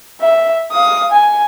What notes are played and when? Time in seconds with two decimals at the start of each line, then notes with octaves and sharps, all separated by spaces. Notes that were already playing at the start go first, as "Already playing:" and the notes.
0.21 E5
0.72 F5 D#6
1.11 G#5